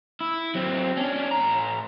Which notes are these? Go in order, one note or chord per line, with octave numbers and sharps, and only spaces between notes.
E4
F#3 C4
C#4 D4
A2 A#5